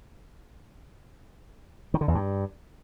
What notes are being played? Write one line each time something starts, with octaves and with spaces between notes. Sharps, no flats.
D#3
D3
E2
G2